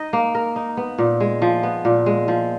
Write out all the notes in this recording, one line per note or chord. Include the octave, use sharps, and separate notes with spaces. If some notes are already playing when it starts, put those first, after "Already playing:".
Already playing: D#4 D#5
A#3
A#4
D#4
B3
A#2
G#3
F3
B3
A#2
G#3
F3